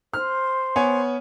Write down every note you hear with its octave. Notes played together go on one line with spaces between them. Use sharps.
C5 F6
B3 C#5 G#5